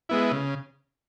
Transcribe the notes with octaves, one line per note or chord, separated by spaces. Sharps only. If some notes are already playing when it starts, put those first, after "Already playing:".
G#3 B3 E4
C#3